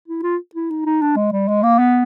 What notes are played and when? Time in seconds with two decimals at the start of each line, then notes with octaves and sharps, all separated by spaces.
0.08 E4
0.23 F4
0.55 E4
0.70 D#4
0.86 D#4
1.02 D4
1.16 G#3
1.32 G3
1.48 G#3
1.63 A#3
1.79 B3